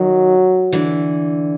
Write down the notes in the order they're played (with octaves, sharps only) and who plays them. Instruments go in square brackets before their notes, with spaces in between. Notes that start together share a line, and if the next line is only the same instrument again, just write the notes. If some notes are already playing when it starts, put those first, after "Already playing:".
Already playing: [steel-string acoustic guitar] D#3 [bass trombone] F#3
[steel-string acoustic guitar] D3 E3